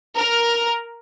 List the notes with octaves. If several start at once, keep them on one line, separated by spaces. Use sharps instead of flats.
A#4